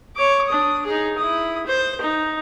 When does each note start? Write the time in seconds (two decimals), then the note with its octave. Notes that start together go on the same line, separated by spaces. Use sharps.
0.16 C#5 D6
0.48 D4 D#6
0.86 D#4 G#4
1.18 E4 D#6
1.66 C5
2.01 D#4